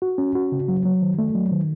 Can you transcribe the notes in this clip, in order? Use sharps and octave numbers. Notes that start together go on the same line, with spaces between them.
F#4
C#4
F#4
C#3
F#3
F#3
D#3
A3
F#3
D#3